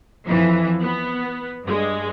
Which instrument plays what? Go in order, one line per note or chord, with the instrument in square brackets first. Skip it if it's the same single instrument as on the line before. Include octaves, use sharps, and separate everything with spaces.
[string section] F2 E3 F3
B3
G2 G#3